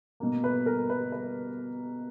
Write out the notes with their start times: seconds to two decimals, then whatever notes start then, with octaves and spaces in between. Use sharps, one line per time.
0.20 B2 A#3
0.44 B4
0.66 A#4
0.90 B4
1.12 B4